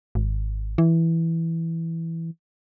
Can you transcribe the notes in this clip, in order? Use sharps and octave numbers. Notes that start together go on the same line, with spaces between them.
G#1
E3